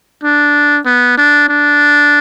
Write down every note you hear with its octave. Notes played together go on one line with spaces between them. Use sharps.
D4
B3
D4
D4